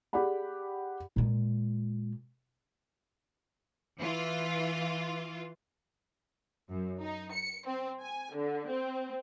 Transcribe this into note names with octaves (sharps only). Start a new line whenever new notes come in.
G4 G#4 D5 F#5 B5
A#2 G#3
E3 F4
F#2
D#4
C#7
C4
G#5
D3
C4